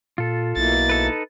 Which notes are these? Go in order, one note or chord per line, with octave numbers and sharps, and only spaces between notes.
A#2 F4 A4
B1 B2 A#3 E4 A6
D#4 A4 B4